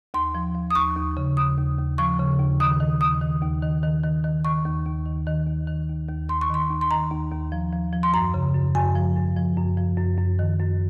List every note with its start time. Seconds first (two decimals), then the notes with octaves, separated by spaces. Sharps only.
0.14 D#2 C6
0.35 F3
0.55 F3
0.70 D#6
0.75 D#2 C#6
0.96 D#2
1.17 C#3
1.37 D#2 D#6
1.57 D#2
1.78 D#2
1.98 F3 C#6
2.19 C#3
2.39 D#2
2.60 D#3 D#6
2.80 D#3
3.01 D#2 D#6
3.21 D#3
3.42 D#2
3.63 D#3
3.83 D#3
4.03 D#3
4.24 D#3
4.45 D#3 C#6
4.65 D#2
4.85 D#2
5.06 D#3
5.27 D#3
5.47 D#2
5.68 D#3
5.88 D#2
6.08 D#2
6.29 D#2 C6
6.41 C#6
6.50 D#3 C6
6.70 D#2
6.81 C6
6.90 D#3 A#5
7.11 D#2
7.31 D#2
7.52 F3
7.73 F3
7.93 F3
8.03 C6
8.13 F#2 A#5
8.34 C#3
8.54 F#2
8.75 F#2 G#5
8.95 F3
9.16 F#2
9.37 F3
9.57 F#2
9.77 F3
9.98 F#2
10.18 F#2
10.39 D#3
10.59 F#2